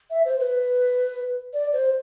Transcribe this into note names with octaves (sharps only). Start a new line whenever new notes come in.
E5
C5
B4
D5
C5